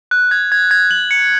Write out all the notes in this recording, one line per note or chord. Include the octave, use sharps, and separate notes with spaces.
F#6
G#6
G#6
G#6
F#7
C#7